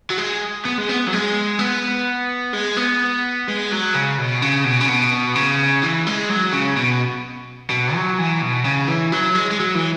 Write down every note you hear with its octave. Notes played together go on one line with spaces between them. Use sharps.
F#3
G#3
B3
G#3
B3
F#3
G#3
B3
G#3
B3
G#3
F#3
C#3
B2
C#3
B2
C#3
B2
C#3
E3
G#3
F#3
C#3
B2
B2
F#3
E3
B2
C#3
E3
F#3
G#3
G#3
F#3
E3